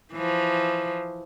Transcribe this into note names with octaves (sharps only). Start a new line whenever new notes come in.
E3 F3